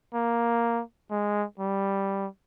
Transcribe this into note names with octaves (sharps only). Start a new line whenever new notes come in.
A#3
G#3
G3